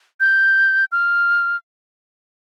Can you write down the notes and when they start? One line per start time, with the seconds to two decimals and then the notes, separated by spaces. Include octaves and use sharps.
0.20 G6
0.92 F6